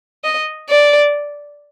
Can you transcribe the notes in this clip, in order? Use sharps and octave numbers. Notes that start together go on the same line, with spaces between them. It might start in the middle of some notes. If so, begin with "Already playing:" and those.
D#5
D5